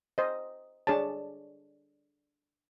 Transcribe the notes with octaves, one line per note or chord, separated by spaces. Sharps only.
C5 D#5
D4 G#4 C#5 A5